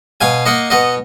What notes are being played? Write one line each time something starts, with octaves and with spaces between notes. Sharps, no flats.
B2 F5 G#5
A#3 D#5 F#5
B2 D#5 F#5